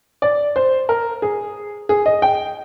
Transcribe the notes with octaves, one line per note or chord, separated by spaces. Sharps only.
D5
C5
A#4
G#4
G#4
D#5
G5